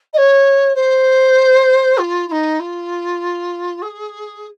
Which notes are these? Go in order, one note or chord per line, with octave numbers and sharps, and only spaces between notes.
D#5
C#5
C5
F4
F4
D#4
F4
G#4